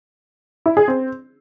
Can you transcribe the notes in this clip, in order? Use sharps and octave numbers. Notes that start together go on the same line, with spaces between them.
E4
G#4
C4